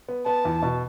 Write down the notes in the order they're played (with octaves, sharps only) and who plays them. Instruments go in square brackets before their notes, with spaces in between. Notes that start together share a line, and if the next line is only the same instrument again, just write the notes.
[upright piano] B3
[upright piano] B3 [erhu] A5
[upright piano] E2
B2